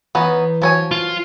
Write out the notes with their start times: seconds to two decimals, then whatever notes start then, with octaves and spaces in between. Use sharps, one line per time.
0.15 E3 B3 C#4 D#4
0.62 F3 F#3 C#5 G#5
0.91 F4